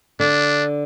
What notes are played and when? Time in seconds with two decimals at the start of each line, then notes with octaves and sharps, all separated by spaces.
0.20 D3 D4